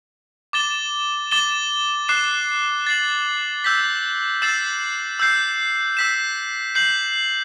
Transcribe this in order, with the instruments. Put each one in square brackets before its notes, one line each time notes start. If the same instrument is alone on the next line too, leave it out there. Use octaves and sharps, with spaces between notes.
[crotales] D6 A6 E7 G7
D6 A6 E7 G7
D6 F#6 C7 E7
A6 C7 F#7
E6 G6 B6
E6 A6 C7 E7
E6 G6 C7
E6 B6 E7
G6 C7 F#7